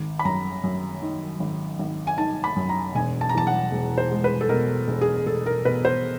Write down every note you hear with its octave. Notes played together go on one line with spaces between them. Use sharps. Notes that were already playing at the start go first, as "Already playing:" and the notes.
Already playing: G#1
B5
F#2 A#5
F#2
D#3
G#1
G#1
G#5
D#3 A5
B5
F#2
A#5
E1 G#5
A5
A#5
E2 A5
F#5
E1
C5
G#3
B4
A4
B2 A#4
E1
G#4
E1 A4
A#4
B2 B4
C5